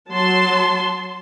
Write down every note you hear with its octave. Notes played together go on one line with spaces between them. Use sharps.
F#3 A5 C6